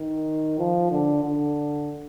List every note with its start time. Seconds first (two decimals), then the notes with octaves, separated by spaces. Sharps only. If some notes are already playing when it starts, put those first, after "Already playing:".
Already playing: D#3
0.59 F3
0.91 D3
1.24 D3